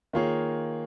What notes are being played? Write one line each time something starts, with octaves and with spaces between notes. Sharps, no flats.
D#3 A#3 F4 G#4 C#5